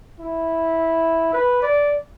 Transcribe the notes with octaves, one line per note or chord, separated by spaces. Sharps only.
E4
B4
D5